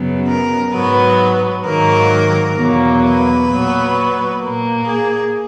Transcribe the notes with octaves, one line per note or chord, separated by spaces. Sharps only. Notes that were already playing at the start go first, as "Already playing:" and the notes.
Already playing: F#2 C#3 F#3 B3
A#4
G#2 F#3 B3 B4
G#2 D#3 F#3 A#3 A#4
E2 B2 F#3 A#3
B4
A#2 F#3 B3
A#2 A#3
G#4